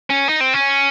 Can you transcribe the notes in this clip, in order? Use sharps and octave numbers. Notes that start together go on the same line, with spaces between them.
C#4
D#4
C4
C#4